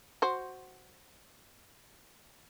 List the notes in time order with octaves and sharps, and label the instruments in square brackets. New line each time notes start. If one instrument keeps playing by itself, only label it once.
[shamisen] F#4 C5